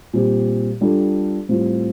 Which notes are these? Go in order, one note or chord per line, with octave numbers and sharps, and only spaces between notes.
A#2 G3 C4 G4
G3 D4 F4 A4
A2 G3 C4 F4